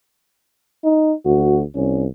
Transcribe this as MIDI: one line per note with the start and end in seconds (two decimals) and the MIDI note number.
0.84 1.14 63
1.26 1.63 38
1.26 1.61 66
1.75 2.07 36
1.75 2.04 61